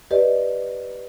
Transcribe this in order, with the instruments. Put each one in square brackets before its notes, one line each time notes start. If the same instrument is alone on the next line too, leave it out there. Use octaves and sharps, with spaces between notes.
[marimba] G4 B4 D5 D#5